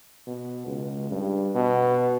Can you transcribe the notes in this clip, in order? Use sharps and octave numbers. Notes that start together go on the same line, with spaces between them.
B2
C#2
G2
B2